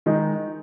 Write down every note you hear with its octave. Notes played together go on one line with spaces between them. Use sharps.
D#3 G#3 D#4